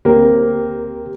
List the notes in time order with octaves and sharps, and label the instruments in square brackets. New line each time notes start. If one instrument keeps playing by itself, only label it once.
[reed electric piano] D2 G4 A#4 [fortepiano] A#3 C4